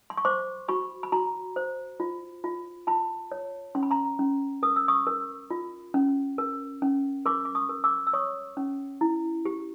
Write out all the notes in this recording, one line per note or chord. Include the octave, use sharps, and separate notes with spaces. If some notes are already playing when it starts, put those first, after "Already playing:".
C6
C#6
C5 C6 D6
F#4 B5 C#6
B5
F#4 A#5 C6
C5
F4
F4
F4 A5 B5
C#5
C#4 C6
B5
A#5 C6
C#4
A#4 D#6
E6
C#6 D#6
A#4
F4
C#4
A#4
C#4
A#4 C6 D6
D6
C#6 D#6
A#4
D6 E6
E6
C#5 C#6 D#6
C#4
E4
G4